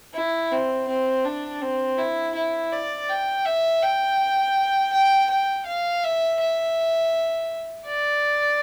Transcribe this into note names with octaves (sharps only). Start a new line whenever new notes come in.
E4
C4
C4
D4
C4
E4
E4
D5
G5
E5
G5
G5
G5
F5
E5
E5
D5